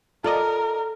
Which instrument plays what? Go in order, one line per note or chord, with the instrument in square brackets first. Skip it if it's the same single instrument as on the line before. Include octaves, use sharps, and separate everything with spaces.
[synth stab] F4 D5 D#5 [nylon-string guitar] A4 [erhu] A#4